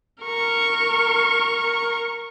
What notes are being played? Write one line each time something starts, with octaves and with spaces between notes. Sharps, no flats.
A#4 C#6